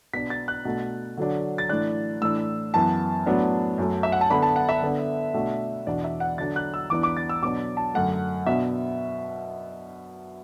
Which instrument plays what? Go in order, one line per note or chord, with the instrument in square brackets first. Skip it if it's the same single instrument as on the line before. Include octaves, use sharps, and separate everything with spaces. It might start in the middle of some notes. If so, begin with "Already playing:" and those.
[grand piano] B2 B3 D4 B6
A6
F#6
B2 A3 D4
D3 F#3 D4
A6
A2 E3 D4 F#6
A2 E3 D4 E6
F#2 E3 B3 A5
A2 F#3 B3 D4
F#2 F#3 A3
E5
F#5
A5
D3 B3 D4 B5
A5
F#5
E5
D3 B3 D4
B2 A3 D4
E2 B2 B3 D4 D5
E5
F#5
D3 F#3 D4 A6
F#6
E6
E2 E3 B3 D4 D6
D6
A6
E6
B2 F#3 B3 D4 D6
A5
F#2 D3 A3 F#5
B2 B3 D4 E5